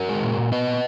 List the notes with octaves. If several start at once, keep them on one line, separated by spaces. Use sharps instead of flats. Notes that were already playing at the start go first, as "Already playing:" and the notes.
Already playing: F#4 A#4
G#3
A#2
A#2
B3 B4 D#5
A#2